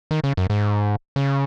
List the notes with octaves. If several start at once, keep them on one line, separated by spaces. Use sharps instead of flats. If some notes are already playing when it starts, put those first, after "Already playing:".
D#3
C#3
F#2
G#2
C#3